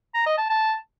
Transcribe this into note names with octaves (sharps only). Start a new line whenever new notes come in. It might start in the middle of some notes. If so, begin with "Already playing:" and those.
A#5
D#5
A5
A5